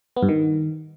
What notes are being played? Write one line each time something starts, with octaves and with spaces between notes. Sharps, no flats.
B3
G2
D#3